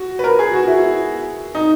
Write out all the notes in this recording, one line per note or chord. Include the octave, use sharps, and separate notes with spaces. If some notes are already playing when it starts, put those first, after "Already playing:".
Already playing: F#4
B4
A#4
G#4
F#4
E4
D#4